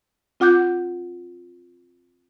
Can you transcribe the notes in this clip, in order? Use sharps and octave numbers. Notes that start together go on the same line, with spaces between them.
C4 F4 F#5 D6 F#6 G6